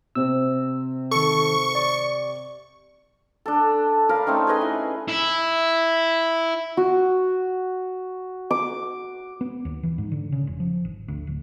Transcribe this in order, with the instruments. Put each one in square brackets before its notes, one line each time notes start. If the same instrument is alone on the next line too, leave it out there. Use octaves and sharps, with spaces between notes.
[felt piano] C3 C4 [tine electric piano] E6
[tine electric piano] D#3 A4 [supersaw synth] C#6
[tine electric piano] D5
[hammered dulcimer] D4 A4
A#4 F5 B5
A3 C4 C#4 D#4
G#4 B4 D#5 G#5
E4
[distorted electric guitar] E4
[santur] F#4
D6
[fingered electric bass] B3
D#2
E3
G#2
D3
C#3
E1
F3
G#1
D2
D1